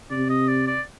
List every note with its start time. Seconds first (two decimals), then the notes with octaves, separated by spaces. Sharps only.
0.11 C3 D5
0.30 D#5
0.48 D5
0.67 D5